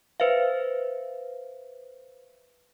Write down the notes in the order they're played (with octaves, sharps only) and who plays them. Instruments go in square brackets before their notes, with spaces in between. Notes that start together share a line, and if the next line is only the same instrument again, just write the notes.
[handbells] B4 C5 E5 F5